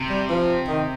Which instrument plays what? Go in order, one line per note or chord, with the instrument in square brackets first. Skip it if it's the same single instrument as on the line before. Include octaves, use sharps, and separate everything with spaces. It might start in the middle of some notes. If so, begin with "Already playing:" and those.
Already playing: [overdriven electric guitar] C3
[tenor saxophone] G3
F3
D#3